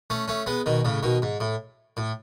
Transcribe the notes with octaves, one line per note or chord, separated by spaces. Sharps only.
A3 C#4
A3 C#4
G#3 B3
B2 D#3
A2 C#3
B2 D#3
G#2
A2
A2